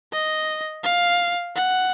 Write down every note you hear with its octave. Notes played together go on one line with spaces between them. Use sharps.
D#5
F5
F#5